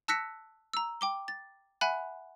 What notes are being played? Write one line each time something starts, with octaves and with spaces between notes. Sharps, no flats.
A5 E6 F#6 A#6 B6 C#7
A#5 E6
G5 D6 G7
A6
E5 F#5 G#5 B5 F#6